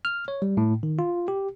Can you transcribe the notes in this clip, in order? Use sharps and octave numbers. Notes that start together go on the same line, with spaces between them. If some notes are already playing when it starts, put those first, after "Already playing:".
F6
C#5
G3
A2
D#3
F4
G4